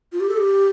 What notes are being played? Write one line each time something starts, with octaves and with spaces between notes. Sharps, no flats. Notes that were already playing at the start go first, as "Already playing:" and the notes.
F4
G4
A4
G4